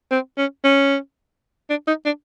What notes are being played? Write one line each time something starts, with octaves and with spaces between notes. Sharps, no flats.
C4
C#4
C#4
D4
D#4
D4